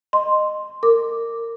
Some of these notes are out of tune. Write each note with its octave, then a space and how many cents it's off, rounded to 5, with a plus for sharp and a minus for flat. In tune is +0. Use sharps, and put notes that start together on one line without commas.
D#5 -20 C6 +0
A#4 -20 D6 +0